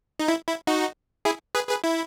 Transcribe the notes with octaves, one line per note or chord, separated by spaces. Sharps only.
D#4
E4
E4
D#4 F#4
E4 G#4
G#4 B4
G#4 B4
E4